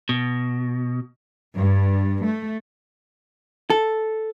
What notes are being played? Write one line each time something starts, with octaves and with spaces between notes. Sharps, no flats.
B2
G2
A3
A4